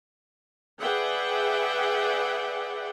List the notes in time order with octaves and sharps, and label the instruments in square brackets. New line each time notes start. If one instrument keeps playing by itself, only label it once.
[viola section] G#4 B4 D5 E5 F#5 G5